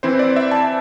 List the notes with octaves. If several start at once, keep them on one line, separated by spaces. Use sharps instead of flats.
E3 C4 E4 C5
D5
E5
A5